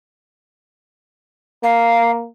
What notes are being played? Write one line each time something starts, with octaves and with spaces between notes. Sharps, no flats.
A#3 F5